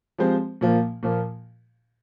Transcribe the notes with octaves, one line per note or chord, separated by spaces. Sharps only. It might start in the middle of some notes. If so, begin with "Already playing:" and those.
F3 G#3 C4 G4 C5
A#2 F3 A#3
A#2 F3 A#3